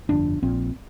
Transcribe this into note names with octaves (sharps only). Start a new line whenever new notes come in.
G1 F2 D3 D4
A#1 A#2 C4